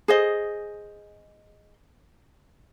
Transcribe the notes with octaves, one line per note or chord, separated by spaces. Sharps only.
G#4 C5 D#5